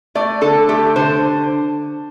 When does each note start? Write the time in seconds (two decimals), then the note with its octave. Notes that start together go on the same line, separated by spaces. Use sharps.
0.15 A3 D5
0.41 D3 A4
0.68 A3 G4
0.96 D3 C5